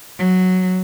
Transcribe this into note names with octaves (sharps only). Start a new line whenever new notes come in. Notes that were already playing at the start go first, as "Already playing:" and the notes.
F#3